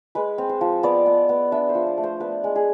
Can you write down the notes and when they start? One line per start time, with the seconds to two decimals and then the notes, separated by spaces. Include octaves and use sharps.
0.15 G#3 B4
0.38 C4
0.49 C5
0.61 F3
0.83 B3 D5
1.06 B3
1.29 B3
1.52 D4 E5
1.69 C5
1.75 F3
1.86 D5
1.98 A3
2.03 C5
2.20 B3 B4
2.44 G#3
2.56 G#4